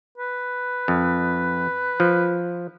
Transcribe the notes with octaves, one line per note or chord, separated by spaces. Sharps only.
B4
F2
F3